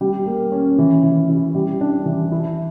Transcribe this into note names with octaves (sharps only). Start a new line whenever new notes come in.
G3
A#3
C#4
E3
E3
E4
G3
D4
E3
E4